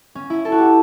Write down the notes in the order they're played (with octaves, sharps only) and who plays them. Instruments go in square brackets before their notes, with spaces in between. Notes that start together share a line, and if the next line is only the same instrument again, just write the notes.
[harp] C#4
E4
A4
F#4
G4